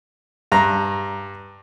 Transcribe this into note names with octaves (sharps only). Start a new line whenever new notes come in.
G2 A#5